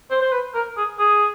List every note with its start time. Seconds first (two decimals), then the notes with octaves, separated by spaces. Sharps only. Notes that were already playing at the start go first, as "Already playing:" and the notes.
0.11 C5
0.21 C5
0.32 B4
0.55 A#4
0.77 G#4
0.99 G#4